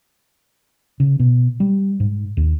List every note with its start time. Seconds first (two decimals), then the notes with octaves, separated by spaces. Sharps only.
1.00 C#3
1.20 B2
1.60 G3
2.00 G#2
2.37 D#2